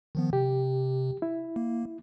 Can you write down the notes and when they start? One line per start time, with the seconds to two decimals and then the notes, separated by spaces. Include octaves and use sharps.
0.15 D#3 F3 B3
0.33 C3 G4
1.22 E4
1.56 A#3